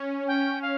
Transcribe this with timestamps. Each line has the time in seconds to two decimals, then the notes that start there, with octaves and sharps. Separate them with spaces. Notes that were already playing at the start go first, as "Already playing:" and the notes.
Already playing: C#4
0.28 G5
0.62 F5